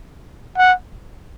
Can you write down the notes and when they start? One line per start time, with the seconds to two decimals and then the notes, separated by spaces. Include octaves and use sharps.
0.57 F#5